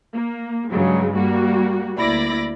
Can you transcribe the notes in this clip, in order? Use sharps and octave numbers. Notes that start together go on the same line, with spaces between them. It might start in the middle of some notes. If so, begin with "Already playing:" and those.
A#3
G2 C#3 F#3 G#3
G3 A#3 F#4
D2 A#3 E4 D5 B5 A#6